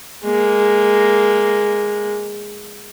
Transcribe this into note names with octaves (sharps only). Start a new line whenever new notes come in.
G#3 A#3